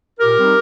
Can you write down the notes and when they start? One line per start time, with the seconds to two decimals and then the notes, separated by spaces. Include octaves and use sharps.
0.20 A#2 G4 A#4
0.37 G3 C4 D#4